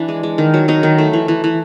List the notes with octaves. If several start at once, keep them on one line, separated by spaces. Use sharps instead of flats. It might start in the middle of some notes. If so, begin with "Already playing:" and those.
Already playing: E3 D4
G#3
G#3
D#3
F#3
F#3 D#4
D#3
A3
E3
E3
E3